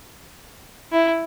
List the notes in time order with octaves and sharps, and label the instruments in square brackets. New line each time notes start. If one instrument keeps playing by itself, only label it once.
[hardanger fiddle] E4